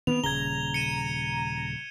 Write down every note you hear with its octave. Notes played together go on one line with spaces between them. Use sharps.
D#3 B3 C4 F7
D#1 C#3 A#5 G#6 G7
C#7 D#7 E7